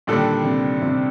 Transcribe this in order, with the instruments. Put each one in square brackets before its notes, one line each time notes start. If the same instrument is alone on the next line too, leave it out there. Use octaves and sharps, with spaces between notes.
[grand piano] D#2 D3 G3 D4 A4 [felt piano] A#2
[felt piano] C3
C3